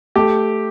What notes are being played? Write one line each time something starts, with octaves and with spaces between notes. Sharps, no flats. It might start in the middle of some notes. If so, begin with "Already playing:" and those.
A3 G4